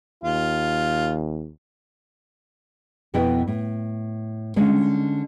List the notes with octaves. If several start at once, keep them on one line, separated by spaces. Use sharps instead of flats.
D#2 F4
F2 B2 B3 E4 D#5 G5
A2
D3 G#3 C#4 D#5